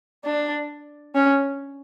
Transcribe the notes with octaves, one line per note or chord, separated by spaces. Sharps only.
D4
C#4